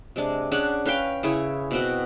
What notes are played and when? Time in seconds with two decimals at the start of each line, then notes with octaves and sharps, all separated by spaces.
0.16 C3 G#3 D4
0.51 C#4 D4 G#4 F#5
0.86 C#4 B4 F5 G5
1.23 C#3 E4 G#4 C#5
1.71 B2 C4 F#4